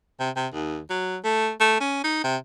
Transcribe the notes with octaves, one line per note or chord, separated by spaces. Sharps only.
C3
C3
D#2
F#3
A3
A3
C#4
D#4
C3